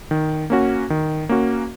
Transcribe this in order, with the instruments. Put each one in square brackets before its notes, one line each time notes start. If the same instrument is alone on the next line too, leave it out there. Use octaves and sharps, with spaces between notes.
[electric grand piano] D#3
A#3 C#4 F#4
D#3
A#3 C#4 F#4